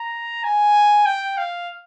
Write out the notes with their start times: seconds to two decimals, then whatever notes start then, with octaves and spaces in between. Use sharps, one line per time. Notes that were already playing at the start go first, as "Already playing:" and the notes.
Already playing: A#5
0.44 G#5
1.06 G5
1.37 F5